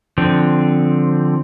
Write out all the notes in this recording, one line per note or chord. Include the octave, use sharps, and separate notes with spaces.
D3 F3 C4